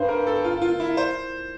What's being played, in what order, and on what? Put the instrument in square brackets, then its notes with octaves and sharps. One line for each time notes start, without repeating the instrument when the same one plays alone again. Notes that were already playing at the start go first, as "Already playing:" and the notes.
Already playing: [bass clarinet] G2 [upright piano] C5
[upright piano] A#4
A4
F4
F4
E4
C5